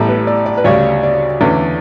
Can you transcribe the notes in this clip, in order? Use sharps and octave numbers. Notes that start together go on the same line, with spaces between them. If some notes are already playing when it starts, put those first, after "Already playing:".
Already playing: A1 A2 G3 A4
B4
D5
D5
B4
D2 C#3 G3 D4 C#5
D5
E2 D3 A3 C#4